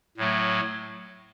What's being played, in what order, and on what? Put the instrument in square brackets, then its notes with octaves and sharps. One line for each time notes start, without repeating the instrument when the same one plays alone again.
[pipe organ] A2 F#3 A3